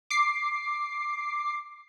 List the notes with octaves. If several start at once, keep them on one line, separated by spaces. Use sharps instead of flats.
D6 C7